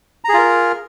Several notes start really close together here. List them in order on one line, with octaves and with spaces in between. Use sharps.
A#5 G#4 F4 A#4